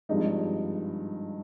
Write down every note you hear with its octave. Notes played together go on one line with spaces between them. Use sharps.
G#1 G2 F3 G#3 D#4